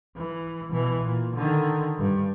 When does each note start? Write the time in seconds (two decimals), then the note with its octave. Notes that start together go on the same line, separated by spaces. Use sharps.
0.17 E3
0.70 B2 E3
1.03 A#2
1.36 D3 D#3
1.98 G2